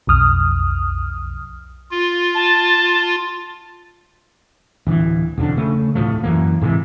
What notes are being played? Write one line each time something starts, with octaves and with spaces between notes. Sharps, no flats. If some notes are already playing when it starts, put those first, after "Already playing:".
B1 F2 D#6 F6
F4
A5
D1 E3
E1 F2 D3 D4
C#3 A3
D1 A2 F3 A3
F#2 E3 A#3
G#2 C3 D#3 E3